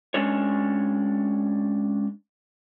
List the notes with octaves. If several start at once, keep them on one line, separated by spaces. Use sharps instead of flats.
G#3 C#4 D4 C#5